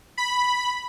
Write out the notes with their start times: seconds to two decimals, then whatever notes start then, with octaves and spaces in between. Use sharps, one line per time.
0.17 B5